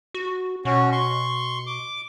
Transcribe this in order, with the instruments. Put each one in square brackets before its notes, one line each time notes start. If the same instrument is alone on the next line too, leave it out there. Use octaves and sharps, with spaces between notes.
[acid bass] F#4
[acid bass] B2 [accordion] C#4 F#4
[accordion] C6 C#6
D6